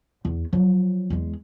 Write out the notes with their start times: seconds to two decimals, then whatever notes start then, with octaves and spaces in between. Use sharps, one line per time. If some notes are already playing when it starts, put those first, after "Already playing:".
0.25 E2
0.53 F3 F#3
1.10 E2 G#3